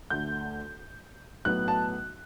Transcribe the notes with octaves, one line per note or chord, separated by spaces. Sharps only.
D2 D3 A3 G6
B1 A2 F#3 B3 F#6
A5